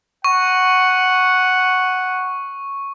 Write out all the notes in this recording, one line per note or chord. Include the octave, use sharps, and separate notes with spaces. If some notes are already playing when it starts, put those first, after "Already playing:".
F#5 C#6